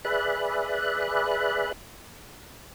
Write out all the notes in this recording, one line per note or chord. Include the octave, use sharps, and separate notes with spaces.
G#4 B4 D5 E5 B5 F#6